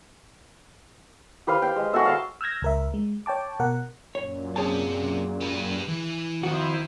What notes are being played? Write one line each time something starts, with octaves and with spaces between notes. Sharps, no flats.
G4 B4 C5 F5
F5 G5
G#3
F#4 G#4 A4 E5
F5 A5 C6
E6 F6 G6 G#6 A#6
C#2 A#4 E5
G#3
C#5 G5 A5 D6
B2 A#4 F#5
F#2 A#2 C#5
C3 G#4 C#5 A5
G4 B4
E3
F2 D#3 E4 F#4 C5